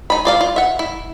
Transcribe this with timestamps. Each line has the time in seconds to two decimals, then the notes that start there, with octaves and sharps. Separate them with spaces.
0.10 D#4 B5
0.25 F4 D5 F5
0.41 F4
0.56 E5 F#5
0.79 E4